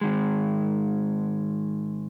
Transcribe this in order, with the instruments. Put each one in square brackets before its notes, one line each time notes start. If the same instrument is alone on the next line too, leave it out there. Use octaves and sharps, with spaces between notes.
[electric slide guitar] G#2 D#3 G#3